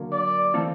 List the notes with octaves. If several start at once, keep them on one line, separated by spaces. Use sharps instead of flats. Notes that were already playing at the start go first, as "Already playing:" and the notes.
Already playing: D3 F#3 A#3
D5
E3 A3 C4 F4 A4